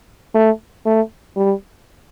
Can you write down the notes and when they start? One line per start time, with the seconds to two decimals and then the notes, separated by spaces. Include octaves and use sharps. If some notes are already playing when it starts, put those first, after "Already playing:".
0.35 A3
0.86 A3
1.37 G3